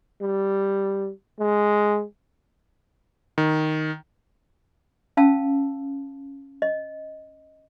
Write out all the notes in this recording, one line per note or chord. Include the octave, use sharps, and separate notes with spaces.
G3
G#3
D#3
C#4 F5 A5 E6
D#5